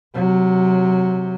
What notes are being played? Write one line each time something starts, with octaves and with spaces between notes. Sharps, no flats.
C3 F#3